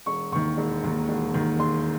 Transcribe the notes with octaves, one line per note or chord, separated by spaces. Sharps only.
E1 C#6
D#2 D#3 C#6
E1
D#2 D#3
E1
D#2 D#3
E1 C6